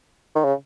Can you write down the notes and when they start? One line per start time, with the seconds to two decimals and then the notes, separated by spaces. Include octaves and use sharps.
0.35 D#3
0.45 C#3